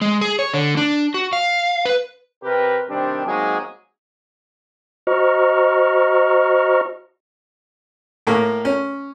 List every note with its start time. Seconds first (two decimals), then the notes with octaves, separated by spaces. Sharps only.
0.01 G#3
0.21 G#4
0.39 C#5
0.54 D3
0.77 D4
1.14 F#4
1.33 F5
1.85 B4
2.43 C3 G4 A#4 B4
2.90 C3 D#3 G3 C4 D4
3.26 F#3 G#3 A#3 C4 D#4 G#4
5.07 F#4 C5 D#5 A#5 C#6 F6
8.27 A2 A#3
8.65 C#4